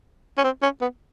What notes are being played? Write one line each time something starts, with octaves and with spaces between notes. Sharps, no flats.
C#4
C4
C#4
B3